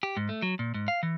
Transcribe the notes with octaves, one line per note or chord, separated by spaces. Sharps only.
G4
G#2
A3
F#3
A#2
G#2
F5
E3